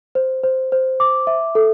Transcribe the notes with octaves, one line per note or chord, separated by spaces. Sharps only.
C5
C5
C5
D6
E5
A4